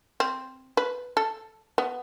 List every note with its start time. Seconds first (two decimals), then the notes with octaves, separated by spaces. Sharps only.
0.20 C4
0.77 B4
1.17 A4
1.78 B3